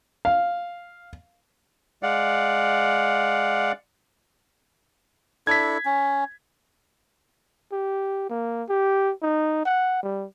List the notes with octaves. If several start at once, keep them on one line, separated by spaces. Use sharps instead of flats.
F5
G#3 D5 F5 F#5
D4 E4 A4 G#6 B6
C#4
G4
A#3
G4
D#4
F#5
G3